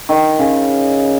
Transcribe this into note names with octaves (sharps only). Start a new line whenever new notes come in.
D#3
C#3